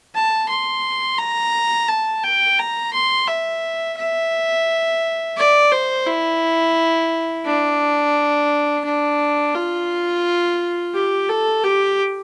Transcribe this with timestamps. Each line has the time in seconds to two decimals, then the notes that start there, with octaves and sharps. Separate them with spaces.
0.15 A5
0.49 C6
1.19 A#5
1.89 A5
2.24 G5
2.58 A#5
2.93 C6
3.28 E5
3.97 E5
5.37 D5
5.72 C5
6.07 E4
7.45 D4
8.85 D4
9.54 F4
10.94 G4
11.29 A4
11.64 G4